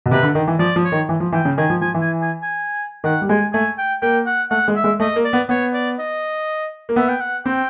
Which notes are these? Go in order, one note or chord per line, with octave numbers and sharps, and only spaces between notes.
B2
C3 B4
D3
D#3
E3
F3 D5
F3
C#5
D#3
E3
F3
E3 G5
C#3
D#3 G#5
F3
F3 G#5
E3
G#5
G#5
G#5
D#3 F#5
G3
G#3 G#5
A3 G#5
G5
A#3 G5
F#5
A3 F#5
G#3
E5
G#3
A3 D#5
A#3
D5
B3
B3 C#5
D5
D#5
A#3
B3 E5
G5
F#5
C4 G5